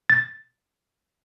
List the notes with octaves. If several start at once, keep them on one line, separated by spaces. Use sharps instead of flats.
A6